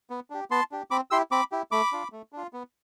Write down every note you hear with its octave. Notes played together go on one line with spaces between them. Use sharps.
B3
D4 G4
B3 A5 C6
D4 G4
C4 B5 D6
E4 G4 C6 E6
C4 B5 D6
E4 G4
A3 B5 D6
D4 F4
A3
D4 F4
B3